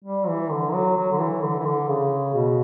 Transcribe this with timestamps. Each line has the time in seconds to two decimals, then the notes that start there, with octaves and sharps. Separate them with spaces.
0.04 G3
0.28 E3
0.51 D3
0.73 F#3
0.97 F#3
1.12 D3
1.19 E3
1.42 D3
1.59 E3
1.65 D3
1.88 C#3
2.34 B2